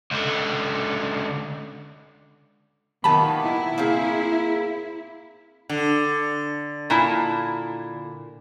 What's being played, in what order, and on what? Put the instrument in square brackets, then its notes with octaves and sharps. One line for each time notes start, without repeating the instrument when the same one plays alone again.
[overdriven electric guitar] C#2 D3
[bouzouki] A#2 B3 G4 [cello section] D#3 [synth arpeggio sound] A5 B5
[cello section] E4
[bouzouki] A#3 C4 G#4
[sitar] D3
[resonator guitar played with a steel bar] A#2 E4 A5